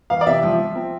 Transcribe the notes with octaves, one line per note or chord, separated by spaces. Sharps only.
E3 F5
D5
C3 E5
F3
F3
C4